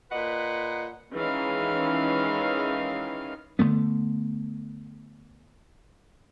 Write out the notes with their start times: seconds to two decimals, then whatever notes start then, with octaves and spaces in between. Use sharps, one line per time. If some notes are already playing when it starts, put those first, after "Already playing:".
0.10 A#2 B4 D#5 F#5
1.12 D#3 E3 G#3 C#4 D#4 F5
3.59 D3 F3 A3 B3